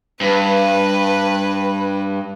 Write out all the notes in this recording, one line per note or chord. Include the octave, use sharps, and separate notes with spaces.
G2 B4